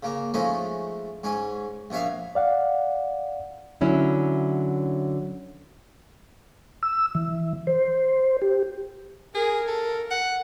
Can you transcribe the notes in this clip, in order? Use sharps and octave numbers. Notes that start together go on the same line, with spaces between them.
C#3 A#3
F3 G#3 A3 C#4 D#4
G#2 C#4 G#5
A#1 B2 C#5 E5 F5
D5 F5 F#5
D3 F#3 C#4 E4
E6
E3
C5
G4
G#4 A#4
A4
F#5